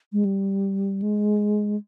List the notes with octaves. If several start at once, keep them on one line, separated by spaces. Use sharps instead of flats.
G#3
G3
G#3